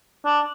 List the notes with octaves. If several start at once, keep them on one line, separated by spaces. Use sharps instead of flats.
D4